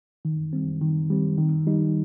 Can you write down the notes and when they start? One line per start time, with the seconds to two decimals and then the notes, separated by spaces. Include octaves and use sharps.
0.25 D#3
0.53 G3 C4
0.81 D#3
1.10 G3 C4
1.38 D#3
1.67 G3 D#4